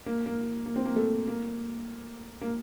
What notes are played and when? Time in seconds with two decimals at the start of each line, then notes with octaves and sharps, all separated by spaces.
0.06 A#3
0.26 A#3
0.66 A#3
0.76 C4
0.85 A#3
0.96 A3
1.27 A#3
2.41 A#3